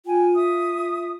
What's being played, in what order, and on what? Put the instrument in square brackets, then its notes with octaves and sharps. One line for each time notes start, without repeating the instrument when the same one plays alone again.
[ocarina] F4 [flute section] G5 G#5
[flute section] E5 D#6